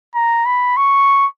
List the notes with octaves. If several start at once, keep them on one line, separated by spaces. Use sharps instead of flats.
A#5
B5
C#6